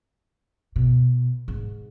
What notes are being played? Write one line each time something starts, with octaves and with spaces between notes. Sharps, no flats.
B2
G#2